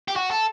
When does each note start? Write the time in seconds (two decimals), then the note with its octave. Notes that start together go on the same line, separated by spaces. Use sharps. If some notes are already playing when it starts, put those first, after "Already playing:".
0.08 G4
0.16 F#4
0.31 A4